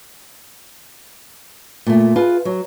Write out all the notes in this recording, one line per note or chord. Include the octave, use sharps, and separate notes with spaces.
A#2 A3
F4 G#4 B4
F#3